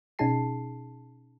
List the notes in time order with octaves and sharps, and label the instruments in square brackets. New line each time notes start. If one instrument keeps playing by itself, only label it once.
[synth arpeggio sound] B2 C#4 D#4 G#4 A5 C7